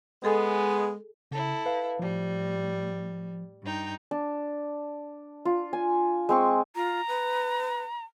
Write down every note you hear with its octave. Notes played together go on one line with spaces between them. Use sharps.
G#3 B3 G#4 A4 G#5
C#3 E4 A4
B4 F5
A2 F3 G3
G2 D#4 G5
D4
F4
G#5
G#3 C4 C#6
F4 A#5
B4